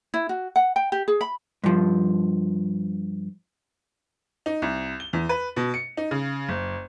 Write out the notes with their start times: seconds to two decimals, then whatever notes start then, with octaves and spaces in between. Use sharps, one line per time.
0.14 E4
0.29 F#4
0.56 F#5
0.76 G5
0.92 G4
1.08 G#4
1.21 B5
1.64 G2 F3
4.46 D#4
4.62 C2
5.00 G7
5.13 E2
5.29 B4
5.57 B2
5.74 C#7
5.97 D#4
6.11 C#3
6.48 F#1